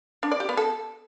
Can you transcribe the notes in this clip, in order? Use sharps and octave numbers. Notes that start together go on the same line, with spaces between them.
D4
D5
G4
B3
A4